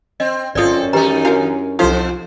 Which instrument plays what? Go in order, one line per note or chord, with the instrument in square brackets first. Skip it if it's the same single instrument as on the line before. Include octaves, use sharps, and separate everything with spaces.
[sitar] C4 [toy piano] D#5
[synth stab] G#1 F4 [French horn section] F#2 C#4 [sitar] C4 A4 [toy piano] D5 D#6
[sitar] D#3 D#4 [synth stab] G#3 [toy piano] G4 B4 A#5
[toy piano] D4 E4 F#4 [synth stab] A#4 F5
[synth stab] C2 F3 F4 [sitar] F2 C5 [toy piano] D#4 A4 F5